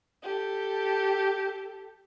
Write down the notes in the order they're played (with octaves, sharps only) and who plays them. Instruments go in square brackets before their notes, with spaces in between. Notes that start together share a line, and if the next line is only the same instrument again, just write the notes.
[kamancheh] G4 A4